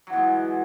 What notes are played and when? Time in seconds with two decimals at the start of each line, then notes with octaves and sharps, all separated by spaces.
0.07 F#3
0.10 E3
0.13 B2
0.16 G#3